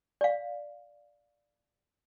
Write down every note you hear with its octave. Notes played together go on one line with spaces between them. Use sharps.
D5 F5